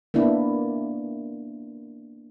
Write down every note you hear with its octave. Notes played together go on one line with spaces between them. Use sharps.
A#3 B3 D4 E4